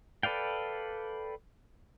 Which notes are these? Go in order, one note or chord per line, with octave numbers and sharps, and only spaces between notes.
A4 B4 D5 F5 G5